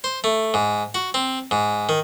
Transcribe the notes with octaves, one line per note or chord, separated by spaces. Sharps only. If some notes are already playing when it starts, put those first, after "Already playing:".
C5
A3
G#2
F#4
C4
G#2
D#3